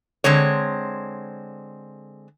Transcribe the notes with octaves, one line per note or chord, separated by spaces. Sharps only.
D3 G#3 C4 C#5